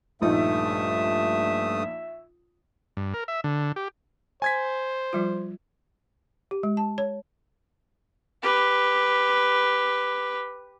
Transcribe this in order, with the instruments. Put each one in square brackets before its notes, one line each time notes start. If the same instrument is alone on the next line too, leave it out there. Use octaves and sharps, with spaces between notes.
[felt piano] A#1 D#4 [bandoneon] G2 A3 D#6 [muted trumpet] E5
[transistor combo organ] G2
A#4
E5
D3
G4
[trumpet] C5 [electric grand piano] G#5 G#6 B6
[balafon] F3 G3 F4
G4
G#3
A5
C#5
[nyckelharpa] G4 B4